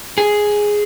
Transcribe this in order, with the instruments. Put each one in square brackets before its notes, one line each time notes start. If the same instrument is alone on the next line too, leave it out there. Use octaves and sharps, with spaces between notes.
[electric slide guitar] G#4